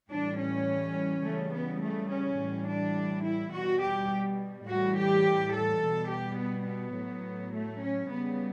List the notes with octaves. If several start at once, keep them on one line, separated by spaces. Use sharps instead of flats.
A2 E3 G3 D4
C#4
C#3 E3 G3 A3
B3
A3
C#4
A2 E3 G3
D4
E4
B2 G3 F#4
G4
A2 E3 G3 F#4
G4
A4
B2 G3
G4
B3
B3
A2 F#3
A3
C#4
C#3 G3 B3